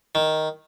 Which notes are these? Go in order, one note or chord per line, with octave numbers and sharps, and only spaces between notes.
D#3